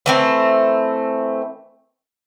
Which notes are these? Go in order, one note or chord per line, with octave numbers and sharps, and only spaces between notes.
E3 A3 C4